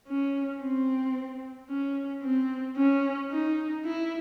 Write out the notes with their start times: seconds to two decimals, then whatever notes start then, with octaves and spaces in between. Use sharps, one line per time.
0.08 C#4
0.62 C4
1.70 C#4
2.23 C4
2.77 C#4
3.31 D#4
3.86 E4